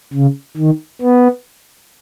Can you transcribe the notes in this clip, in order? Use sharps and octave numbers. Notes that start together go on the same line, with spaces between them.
C#3
D#3
B3